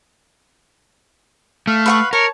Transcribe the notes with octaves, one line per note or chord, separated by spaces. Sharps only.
A3 F5
B4 F#5 C#6
A#4 C#5 A5